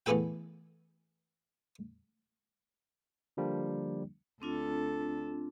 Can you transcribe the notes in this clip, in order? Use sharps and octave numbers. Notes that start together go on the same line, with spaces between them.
E3 A3 B3 G#4 A4 G5
D3 F3 G3 A#3 D4
D2 C4 D4 F4 A4